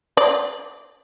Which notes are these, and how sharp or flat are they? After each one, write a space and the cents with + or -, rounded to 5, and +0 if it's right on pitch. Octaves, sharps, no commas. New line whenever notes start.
D5 -15